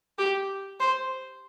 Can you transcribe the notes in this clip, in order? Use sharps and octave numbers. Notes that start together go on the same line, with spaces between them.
G4
C5